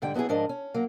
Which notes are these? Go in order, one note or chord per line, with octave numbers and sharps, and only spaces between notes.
G#2 D3 G3 G5
F#3 B3 D#4 E4 G#4
G#2 F3 D4 A#4 D#5
C#4
F#3 A#3